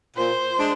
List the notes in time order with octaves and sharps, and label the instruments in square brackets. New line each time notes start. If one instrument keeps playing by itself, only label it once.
[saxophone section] A#2 [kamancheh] C5
[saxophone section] G#3 D4